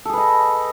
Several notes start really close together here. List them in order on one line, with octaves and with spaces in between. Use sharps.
A4 G#4 B4 D#5